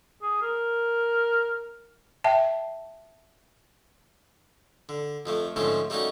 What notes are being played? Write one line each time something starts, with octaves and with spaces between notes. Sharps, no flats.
G#4
A#4
E5 G5 A5
D3
F2 F3 A3
G#2 D3 F3 A3 C4 C#4
G3 A3 A#3 C#4 D#4 F#4